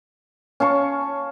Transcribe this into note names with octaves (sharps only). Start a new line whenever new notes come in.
C#4 F5 A5 C#6